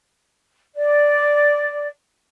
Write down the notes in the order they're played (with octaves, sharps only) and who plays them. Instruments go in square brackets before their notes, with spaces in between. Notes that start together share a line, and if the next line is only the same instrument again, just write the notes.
[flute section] D5